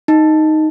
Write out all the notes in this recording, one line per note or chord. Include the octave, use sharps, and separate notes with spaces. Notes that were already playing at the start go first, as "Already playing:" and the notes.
D#4